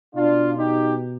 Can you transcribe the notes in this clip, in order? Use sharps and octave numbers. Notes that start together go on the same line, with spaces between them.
B2 D4 F4
D#4 G4